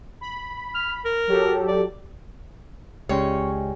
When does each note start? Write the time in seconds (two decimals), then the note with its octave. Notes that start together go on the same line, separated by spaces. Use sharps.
0.21 B5
0.74 F6
1.05 A#4
1.28 F#3 G4 A4
1.68 D5
3.09 C#2 C#3 G#3 C#4 G4 C#5 D5 G5